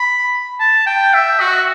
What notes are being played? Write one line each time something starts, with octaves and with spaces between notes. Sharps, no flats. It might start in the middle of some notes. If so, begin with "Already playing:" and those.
Already playing: B5
A5
G5
E5
F#4